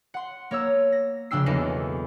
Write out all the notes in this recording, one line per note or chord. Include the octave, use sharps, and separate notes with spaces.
F#5 C6
A#3 C#5 A#5 E6
A#6
F1 C#3 D4 G5 E6 C7
B1 E2 A#3 A4 D#5 C7